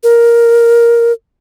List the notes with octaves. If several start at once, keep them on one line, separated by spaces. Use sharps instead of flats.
A#4